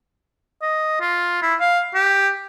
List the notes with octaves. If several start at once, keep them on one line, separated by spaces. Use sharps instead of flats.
D#5
F4
E4
F5
G4